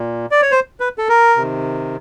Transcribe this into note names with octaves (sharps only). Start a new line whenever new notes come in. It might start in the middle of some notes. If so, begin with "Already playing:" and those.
Already playing: A#2
D5
C#5
C5
B4
A4
A#4
C3 D#3